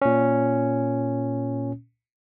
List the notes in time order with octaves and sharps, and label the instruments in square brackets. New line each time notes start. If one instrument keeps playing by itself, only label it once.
[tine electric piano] A#2 C#4